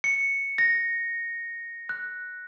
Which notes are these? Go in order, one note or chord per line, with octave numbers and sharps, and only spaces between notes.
C#7
A#6
F#6